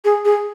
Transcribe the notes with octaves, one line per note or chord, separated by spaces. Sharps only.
G#4
G#4